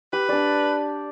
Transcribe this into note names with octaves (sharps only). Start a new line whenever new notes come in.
G4 B4
D4 D5